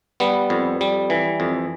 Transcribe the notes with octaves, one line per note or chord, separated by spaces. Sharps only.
G3 B3
F2
G3
E3
F2